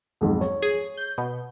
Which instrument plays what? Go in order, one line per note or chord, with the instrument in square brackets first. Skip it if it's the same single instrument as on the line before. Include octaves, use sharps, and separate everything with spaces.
[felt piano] B1 F2 G#2
C#5
[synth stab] G#4
G6
B2